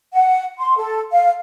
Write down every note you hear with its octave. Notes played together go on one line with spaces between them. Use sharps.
F#5
C6
A4
F5